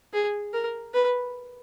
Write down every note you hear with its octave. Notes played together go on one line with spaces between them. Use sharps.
G#4
A#4
B4